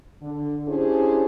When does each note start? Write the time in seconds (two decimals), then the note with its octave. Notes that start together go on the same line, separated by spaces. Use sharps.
0.22 D3
0.68 C#4 D4 E4 G4 G#4 C5